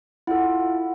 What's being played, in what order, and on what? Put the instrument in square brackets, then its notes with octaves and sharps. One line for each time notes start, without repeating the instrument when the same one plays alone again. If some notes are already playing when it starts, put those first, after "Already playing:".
[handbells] E4 F4 A4 [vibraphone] F#5